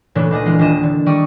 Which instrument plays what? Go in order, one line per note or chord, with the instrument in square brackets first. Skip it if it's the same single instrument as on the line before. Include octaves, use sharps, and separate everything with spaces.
[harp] A#2 C#3 E3 A3 C#4 D4
C#2 D4 D#5
E3 G#3 F4
D#1 D4 D#5 E7
D3
D#3 G3 D5 C#6 D#6